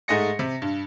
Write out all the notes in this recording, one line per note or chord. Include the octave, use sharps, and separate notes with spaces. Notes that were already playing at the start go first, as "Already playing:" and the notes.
G#2 G#3 A3 D#5 A#6 C#7
C3
G2